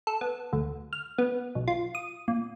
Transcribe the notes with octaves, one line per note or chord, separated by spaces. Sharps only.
A4
B3
D2
F6
B3
B1
F4
D#6
A#2